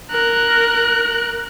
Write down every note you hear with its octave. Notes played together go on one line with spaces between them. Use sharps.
A#4 F#6